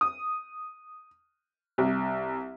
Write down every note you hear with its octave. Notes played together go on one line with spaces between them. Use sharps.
D#6
C2